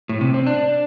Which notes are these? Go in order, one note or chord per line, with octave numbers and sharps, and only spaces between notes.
A2
C3
C4
D4